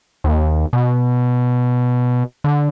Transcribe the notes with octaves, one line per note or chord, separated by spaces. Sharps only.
D#2
B2
D3